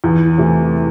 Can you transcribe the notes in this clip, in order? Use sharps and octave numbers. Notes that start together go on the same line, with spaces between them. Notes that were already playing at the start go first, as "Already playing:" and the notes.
E2
C3 E3 A3